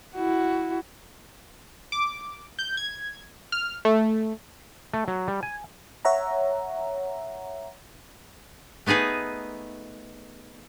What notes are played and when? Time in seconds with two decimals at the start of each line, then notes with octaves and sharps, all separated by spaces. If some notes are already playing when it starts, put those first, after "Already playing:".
0.16 E4 F#4
1.92 D6
2.59 G6
2.77 G#6
3.52 F6
3.85 A3
4.93 A3
5.08 F#3
5.28 G3
5.43 G#5
6.05 C#5 E5 F#5 A#5
8.86 A3 B3 D#4 G#4 B4